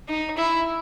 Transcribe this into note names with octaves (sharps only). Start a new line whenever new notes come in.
D#4
E4